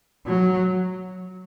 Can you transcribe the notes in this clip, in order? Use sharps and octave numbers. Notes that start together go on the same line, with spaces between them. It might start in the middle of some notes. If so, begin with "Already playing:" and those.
F#3